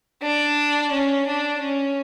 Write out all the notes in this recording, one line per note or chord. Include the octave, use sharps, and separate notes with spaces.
D4
C#4
D4
C#4